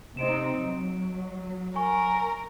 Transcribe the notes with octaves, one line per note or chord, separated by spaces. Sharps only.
C3 C4 D#4 D#5 D7 E7
F#3
A#4 G#5 C#6